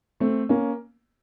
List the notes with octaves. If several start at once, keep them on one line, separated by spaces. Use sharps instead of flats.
A3 C4
A#3 C#4